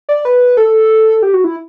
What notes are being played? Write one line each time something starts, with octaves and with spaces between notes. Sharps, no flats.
D5
B4
A4
G4
F#4
E4